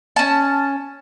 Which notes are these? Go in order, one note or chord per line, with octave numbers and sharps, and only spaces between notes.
C#4 A5